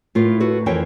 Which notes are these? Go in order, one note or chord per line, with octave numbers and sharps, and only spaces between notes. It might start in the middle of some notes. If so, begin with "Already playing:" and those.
A2 F4 A#4
F#4 A4 B4
F2 E3 A#4 C#5 G5